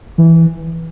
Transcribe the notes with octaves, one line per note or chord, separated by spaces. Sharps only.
E3